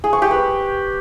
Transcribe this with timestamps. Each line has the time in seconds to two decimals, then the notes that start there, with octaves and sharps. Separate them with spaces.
0.04 G#4
0.13 C#6
0.22 G4
0.31 B4